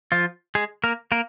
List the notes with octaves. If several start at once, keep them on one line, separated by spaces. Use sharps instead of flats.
F3 F4
G#3 G#4
A#3 A#4
A#3 A#4